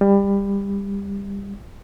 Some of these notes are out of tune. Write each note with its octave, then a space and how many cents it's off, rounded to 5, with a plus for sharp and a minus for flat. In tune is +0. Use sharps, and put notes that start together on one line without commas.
G3 +20